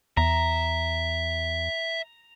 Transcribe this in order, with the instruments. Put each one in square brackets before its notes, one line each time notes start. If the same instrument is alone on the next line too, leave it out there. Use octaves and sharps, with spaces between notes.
[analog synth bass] E2 [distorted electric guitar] E5 [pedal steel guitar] A#5